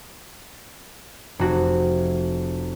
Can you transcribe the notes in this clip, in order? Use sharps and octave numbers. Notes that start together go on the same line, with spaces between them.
F1 F#4